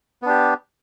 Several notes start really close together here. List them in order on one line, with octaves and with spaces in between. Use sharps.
B3 D4 G4